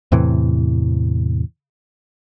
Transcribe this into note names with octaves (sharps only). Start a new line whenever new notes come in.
E2 A2 C3 E3